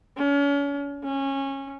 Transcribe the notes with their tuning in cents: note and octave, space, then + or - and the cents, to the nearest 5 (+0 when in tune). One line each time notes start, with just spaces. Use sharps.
C#4 +40
C#4 -20